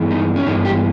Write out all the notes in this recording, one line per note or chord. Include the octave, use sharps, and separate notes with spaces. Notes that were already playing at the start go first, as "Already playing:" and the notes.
Already playing: G2 E3 G#3 B3
D#4
C#4
G2 E3 G#3 B3 D#4
G4